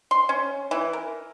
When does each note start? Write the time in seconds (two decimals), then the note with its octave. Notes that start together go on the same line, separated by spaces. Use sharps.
0.11 C6
0.29 C#4
0.71 E3
0.93 A#4